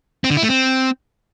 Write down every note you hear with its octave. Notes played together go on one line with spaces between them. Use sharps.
C4
D3
E4
A3
C4